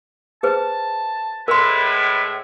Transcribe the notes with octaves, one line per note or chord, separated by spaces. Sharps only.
G#4 B4 C5 A5
A2 G#3 A#4 B4 C6